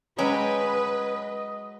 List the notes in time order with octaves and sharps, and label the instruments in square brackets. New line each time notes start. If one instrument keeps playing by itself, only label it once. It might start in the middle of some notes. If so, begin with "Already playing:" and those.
[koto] F#3 G#3 G5 [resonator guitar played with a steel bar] C#4 [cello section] B4 [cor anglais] D#5